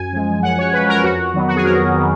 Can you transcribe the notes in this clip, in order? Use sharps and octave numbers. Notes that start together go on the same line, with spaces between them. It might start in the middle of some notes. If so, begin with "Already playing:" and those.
Already playing: F#2 G#5
F3 G#3
F#2 F#5
C#5
F3 G#3 B4
A#4
F2 F#4
D#3 F#3 B3
F#4
G#4
F2 A#4
D#3 F#3 B3